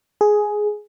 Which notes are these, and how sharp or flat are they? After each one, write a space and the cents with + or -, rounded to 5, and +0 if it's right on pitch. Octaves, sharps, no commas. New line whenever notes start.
G#4 +10